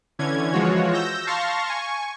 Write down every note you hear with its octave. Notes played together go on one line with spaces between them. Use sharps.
D3 E3 C#4 G#6
E3 F3 G#3 F4 F#4 C#5
E6 G6 A#6
F5 A5 C6 C#6 A#6
G#5 C#6